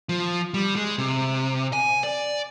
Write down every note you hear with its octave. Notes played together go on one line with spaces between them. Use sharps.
F3
G3
G#3
C3
G#5
D5